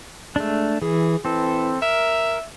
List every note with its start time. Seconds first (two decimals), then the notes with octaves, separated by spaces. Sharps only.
0.36 G#3 A3 D4
0.82 E3 G#4
1.25 E3 C4 A4
1.82 A#4 E5